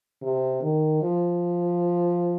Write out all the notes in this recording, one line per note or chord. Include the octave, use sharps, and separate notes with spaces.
C3
D#3
F3